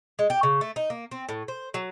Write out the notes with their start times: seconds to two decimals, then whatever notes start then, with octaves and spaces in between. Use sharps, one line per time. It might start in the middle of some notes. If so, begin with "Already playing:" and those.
0.19 G#3
0.30 G4
0.43 C#3
0.61 A3
0.76 D#4
0.90 A#3
1.11 C4
1.29 A2
1.48 C5
1.74 F#3